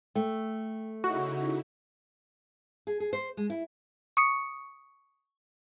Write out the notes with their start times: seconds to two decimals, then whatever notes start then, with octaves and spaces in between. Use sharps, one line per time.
0.15 A3 G5
1.04 C#3 D#4 E4 F#4 C#6
2.87 G#4
3.00 G#4
3.13 C5
3.37 G#3
3.50 E4
4.17 C#6 D#6 C#7